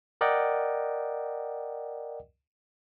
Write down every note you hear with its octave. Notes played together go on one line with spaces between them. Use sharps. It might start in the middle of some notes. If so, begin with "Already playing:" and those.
A#4 D5 D#5 F#5 G5